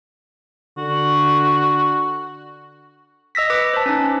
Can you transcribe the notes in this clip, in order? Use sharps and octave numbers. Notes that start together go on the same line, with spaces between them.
D3 F#4
D#5 E6 A#6 B6
B4 D6 E6
C5 A5
C#4 D#4